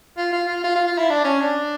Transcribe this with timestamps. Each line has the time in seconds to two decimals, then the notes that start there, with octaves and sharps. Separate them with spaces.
0.17 F4
0.33 F4
0.48 F4
0.64 F4
0.76 F4
0.87 F4
0.98 E4
1.10 D4
1.24 C#4
1.41 D4